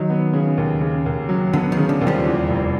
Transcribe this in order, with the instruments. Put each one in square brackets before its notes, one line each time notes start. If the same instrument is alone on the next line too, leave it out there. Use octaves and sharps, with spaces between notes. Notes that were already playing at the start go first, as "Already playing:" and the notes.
Already playing: [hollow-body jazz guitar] D#3 [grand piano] F#3
[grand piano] B3
C#3
D#2
C#3
D#2
F#3
[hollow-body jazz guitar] D3 [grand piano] B3
[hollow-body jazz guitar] D#3
[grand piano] C#3
[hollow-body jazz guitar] D3
[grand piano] D#2
[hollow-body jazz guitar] F3 G3
[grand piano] E2
F1